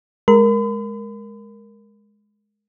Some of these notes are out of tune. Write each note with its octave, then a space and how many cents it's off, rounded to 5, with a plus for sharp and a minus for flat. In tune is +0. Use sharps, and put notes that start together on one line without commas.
G#3 +5 A#4 +0 B5 +45